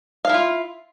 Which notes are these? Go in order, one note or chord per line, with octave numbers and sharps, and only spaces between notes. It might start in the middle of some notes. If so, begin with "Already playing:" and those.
E4 F4 F5